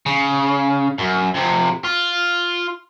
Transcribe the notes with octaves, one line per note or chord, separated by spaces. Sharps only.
C#3
F#2
F2 C3
F4